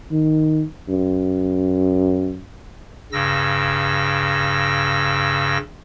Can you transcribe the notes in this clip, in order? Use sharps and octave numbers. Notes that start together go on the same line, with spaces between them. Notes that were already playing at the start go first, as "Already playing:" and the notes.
D#3
F#2
G2 C#3 E6 A#6